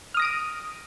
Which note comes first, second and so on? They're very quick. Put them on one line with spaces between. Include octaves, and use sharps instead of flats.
F6 D#6 A#6 D7 D#7